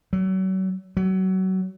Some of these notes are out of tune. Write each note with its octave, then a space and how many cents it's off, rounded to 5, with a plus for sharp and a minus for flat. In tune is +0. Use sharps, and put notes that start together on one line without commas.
F#3 +35
F#3 +25